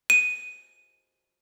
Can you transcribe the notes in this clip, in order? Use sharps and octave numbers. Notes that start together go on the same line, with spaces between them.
D#7